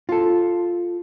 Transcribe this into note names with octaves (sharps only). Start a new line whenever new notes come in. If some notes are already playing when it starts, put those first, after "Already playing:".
F4 A4